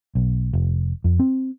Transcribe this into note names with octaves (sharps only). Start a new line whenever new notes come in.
B1
F1
F2
C4